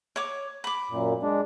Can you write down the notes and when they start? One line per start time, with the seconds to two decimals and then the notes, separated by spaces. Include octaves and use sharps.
0.16 C#5 D6
0.64 B5 D6
0.91 F#2 A#2
1.23 G#3 D4